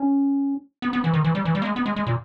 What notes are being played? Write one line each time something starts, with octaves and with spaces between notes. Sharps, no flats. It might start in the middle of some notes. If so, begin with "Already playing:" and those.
Already playing: C#4
B3
B3
E3
D#3
E3
G3
E3
G3
A#3
G#3
B3
G#3
G#3
A#2